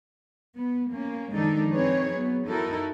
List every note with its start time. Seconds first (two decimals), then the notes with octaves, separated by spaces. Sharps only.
0.56 B3
0.92 A#3 C#4
1.33 D#3 F3 G#3 D4 D#4 A4
1.71 C4 D#4 G#4 B4 C#5
2.13 F#3 B3
2.47 D#4 E4 F#4 A4 A#4